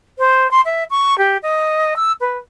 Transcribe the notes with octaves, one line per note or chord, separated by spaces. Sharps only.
C5
C6
E5
C#6
G4
D#5
E6
B4